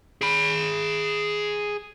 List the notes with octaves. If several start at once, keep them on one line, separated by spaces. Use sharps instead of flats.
G#4 B5